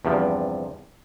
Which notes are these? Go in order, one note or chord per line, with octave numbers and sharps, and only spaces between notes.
E2 G2 C3 F3